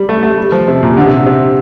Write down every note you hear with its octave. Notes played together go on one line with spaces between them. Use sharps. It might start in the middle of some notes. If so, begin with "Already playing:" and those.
Already playing: G3
A3
A3
G3
F3
C3
A#2
D3
C3
C3